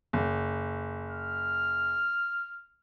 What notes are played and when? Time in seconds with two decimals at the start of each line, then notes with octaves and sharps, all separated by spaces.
0.13 F#1
1.10 F6